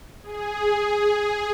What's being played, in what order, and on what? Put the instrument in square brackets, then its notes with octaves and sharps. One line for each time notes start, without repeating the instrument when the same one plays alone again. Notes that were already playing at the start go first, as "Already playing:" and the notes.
[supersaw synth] G#4